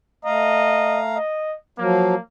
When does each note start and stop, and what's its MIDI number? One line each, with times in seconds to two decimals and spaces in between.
0.25 1.18 57
0.25 1.00 75
0.25 1.18 77
0.25 1.18 82
1.16 1.56 75
1.79 2.15 53
1.79 2.15 54
1.79 2.20 58